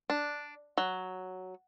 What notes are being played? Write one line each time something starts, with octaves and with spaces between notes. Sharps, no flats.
D4
F#3